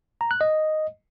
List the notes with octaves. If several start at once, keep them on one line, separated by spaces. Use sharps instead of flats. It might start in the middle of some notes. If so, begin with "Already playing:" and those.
A#5
F#6
D#5